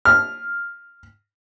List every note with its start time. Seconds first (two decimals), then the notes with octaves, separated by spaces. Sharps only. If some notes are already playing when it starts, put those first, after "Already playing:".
0.05 F6